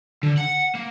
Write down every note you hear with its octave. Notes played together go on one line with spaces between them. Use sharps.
D3
F#5
A#3